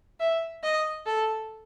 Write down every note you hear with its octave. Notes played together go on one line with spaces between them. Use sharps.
E5
D#5
A4